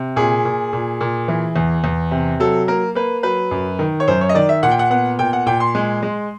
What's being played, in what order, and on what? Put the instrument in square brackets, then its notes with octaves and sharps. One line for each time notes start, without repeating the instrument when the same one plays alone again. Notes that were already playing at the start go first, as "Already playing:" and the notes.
Already playing: [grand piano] C3
A#2 G#4
A#2
A#2
A#2
E3
E2
E2
C3
F#3 A4
A#3 A#4
A#3 B4
F#3 B4
F#2
D#3
C#5
F#2 C5
C#5
D#5
D#3 D5
E5
A#2 F#5
G5
F#5
B3 F#5
A#2 G5
F#5
A#2 G5
C6
G#3
G#3